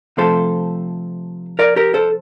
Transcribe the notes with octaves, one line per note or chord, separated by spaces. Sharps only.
C3 F3 A3 A4 C5
A#4 D5
G4 A#4
A4 C5